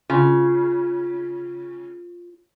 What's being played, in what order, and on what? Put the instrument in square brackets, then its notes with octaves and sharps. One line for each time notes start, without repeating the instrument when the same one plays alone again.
[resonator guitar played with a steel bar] C#3 [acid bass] F4